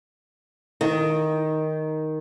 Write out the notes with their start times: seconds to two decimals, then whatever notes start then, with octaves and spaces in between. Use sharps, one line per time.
0.81 D#3